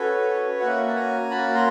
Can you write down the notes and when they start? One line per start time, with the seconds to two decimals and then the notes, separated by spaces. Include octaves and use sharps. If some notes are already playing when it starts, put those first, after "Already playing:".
Already playing: C#4 F#4 A4 B4 C#5
0.59 A#3 C#4 F#4 E5 F#5
0.88 A5
0.95 G#5 A#5
1.31 A#3 C#4 F#4 A5 B5
1.55 A#5 C6